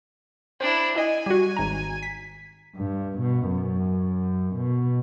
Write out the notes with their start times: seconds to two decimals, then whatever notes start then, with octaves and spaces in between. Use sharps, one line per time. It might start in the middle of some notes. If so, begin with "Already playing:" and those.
0.61 D4 E4 C5
0.96 E4 D#5 G#5
1.26 G3 F#4
1.57 G#1 A#5
2.03 B6
2.76 G2
3.19 B2
3.49 F#2
4.56 B2